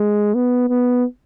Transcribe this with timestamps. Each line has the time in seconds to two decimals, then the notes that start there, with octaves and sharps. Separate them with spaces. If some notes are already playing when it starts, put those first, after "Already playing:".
Already playing: G#3
0.34 B3
0.69 B3